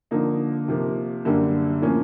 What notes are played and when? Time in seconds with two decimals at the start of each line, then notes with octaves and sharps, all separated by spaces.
0.11 D3 F3 A#3 D#4
0.68 C3 F3 A#3
1.25 F#2 D3 G3 A#3 D4
1.82 A2 F3 A#3 C#4